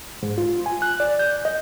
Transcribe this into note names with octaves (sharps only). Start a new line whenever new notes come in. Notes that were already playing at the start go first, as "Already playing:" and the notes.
G#2
F4
G#5
F#6
D5
G6
D#5